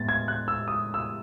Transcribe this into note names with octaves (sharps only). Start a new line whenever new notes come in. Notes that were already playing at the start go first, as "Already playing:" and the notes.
Already playing: A2 G#3 B3 A6
G#6
F#6
E6
D#6
E6